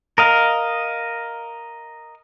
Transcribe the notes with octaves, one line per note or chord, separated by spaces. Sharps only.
A#4 D#5 F5